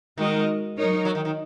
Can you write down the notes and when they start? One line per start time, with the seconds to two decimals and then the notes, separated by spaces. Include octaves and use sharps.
0.18 D#3 G#3 F#4 A#4 D#5
0.77 F#3 D#4 A#4 C#5
1.05 F#3
1.15 D#3
1.25 D#3